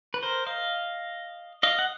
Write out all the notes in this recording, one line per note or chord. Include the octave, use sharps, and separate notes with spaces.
B4
A#4 C5
D#5 F5
D#5 F5
F#5